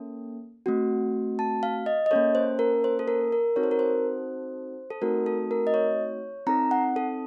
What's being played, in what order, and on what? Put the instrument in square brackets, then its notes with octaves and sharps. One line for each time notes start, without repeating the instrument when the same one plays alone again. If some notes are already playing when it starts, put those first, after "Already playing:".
Already playing: [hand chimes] A#3 C#4 A4
A3 C4 F#4
A5
F5
D#5
D#5
A#3 C#4 A4 C#5
C5
A#4
C5
A4
A#4
A#4
C4 D#4 F#4 A4 C#5
C5
A#4
C5
A4
A3 C4 D#4 F#4 A4 A#4
A4
A#4
D#5
C#5
C4 D#4 A4 A#5
F#5
A4